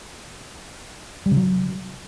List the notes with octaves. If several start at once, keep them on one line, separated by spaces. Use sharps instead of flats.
G3
C#3
F#3